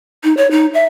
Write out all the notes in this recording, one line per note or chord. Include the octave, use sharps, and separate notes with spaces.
D#4
C#5
D#4
E5